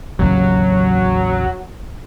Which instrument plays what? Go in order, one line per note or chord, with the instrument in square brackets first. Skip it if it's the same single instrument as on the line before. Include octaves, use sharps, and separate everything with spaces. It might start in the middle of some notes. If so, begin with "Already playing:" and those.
[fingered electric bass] A1 D#2 C#3 [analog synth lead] F#3